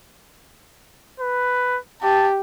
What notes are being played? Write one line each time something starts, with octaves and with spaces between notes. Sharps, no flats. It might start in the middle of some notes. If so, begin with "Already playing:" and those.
B4
G4 A5